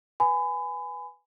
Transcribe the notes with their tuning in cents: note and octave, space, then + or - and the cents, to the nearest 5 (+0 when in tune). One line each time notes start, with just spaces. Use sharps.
B4 +0 G#5 +0 B5 +30